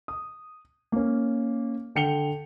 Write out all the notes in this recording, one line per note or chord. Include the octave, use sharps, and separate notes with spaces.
D#6
A#3 C#4
D3 G5 C#7 F7 G7